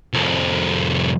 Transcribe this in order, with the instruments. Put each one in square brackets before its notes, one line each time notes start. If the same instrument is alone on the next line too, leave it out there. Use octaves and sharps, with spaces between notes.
[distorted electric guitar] C2 F2